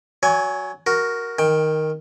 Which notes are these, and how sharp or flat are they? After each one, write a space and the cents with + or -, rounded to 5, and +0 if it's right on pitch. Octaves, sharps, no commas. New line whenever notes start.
F#3 +0 C#5 +40 G#5 +0
F#4 +0 A#4 +0
D#3 +0 G5 +15